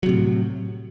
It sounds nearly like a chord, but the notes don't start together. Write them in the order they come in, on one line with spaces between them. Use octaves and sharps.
F#3 C3 A2